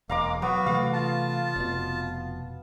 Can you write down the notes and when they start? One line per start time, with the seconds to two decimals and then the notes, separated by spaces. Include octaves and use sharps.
0.09 E1 G#3 A#3 F5 A#5 D6
0.42 F#3 B3 F#4
0.66 C3 E3 A3 F5
0.93 F4 A5
1.56 F1 B2